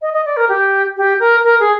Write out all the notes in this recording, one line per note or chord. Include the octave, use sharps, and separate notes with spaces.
D#5
D#5
D5
A#4
G4
G4
A#4
A#4
G#4